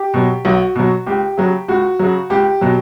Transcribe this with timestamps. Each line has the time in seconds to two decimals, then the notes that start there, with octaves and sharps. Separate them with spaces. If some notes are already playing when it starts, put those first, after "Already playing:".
Already playing: G4
0.14 B2 F#3
0.45 B1 F#4
0.75 B2 F#3
1.07 C#2 G4
1.37 C#3 F#3
1.68 C#2 F#4
1.99 C#3 F#3
2.30 C#2 G4
2.61 B2 F#3